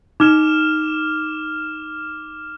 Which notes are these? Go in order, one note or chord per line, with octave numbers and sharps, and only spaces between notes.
D#4 D6 F6 E7